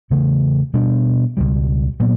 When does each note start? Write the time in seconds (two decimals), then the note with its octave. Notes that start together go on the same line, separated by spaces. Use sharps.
0.10 E2 C#3 E3 A3
0.73 B2 G3 B3 D4
1.37 C#2 B2 G3
2.00 A#2 F#3 B3